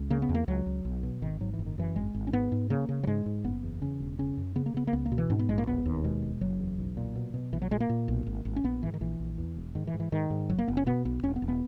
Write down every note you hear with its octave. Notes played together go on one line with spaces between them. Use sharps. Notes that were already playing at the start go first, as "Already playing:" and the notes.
Already playing: C#2
C#3 A#3
B3
E2
A#3
C#2 F#3
C#2
B1
B2
G#1 D#3
G#2 F#3
E3
F#1
D#3
F#2 E3
G#1 G#3
G#1
C#4
G#2 B3
G#2
C#3 A#3
C#3
F#3
G#2 G#3
G#2
F#1 B3
E2
C#3 C#4
E1
C#3 C#4
F#2
C#3 B3
A#3
C#3 B3
A#3
C#2 B3
A#3
B2
E3
G#2 C#4
B3
A#1 G#3
A#3
E1 B3
D#2
B2 G#3
E1
F#1 F#3
E2
B1
A#2
B2
B2
A#1 E3
F#3
A#2 G#3
A#3
A#2
B1
G#1
G#1
C#4
A#1 B3
G#2 E3
D#3
A#1 E3
A#1
E2
E1
G#2 D#3
E3
G#2
E3
G#2 D#3
G#2
F#1 F#3
A#3
F#1 B3
C#4
B2 B3
B1 B3
E1 C#4
B3
E1
B3